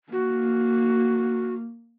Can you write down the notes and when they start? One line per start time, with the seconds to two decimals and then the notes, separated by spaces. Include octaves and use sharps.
0.12 A#3 F#4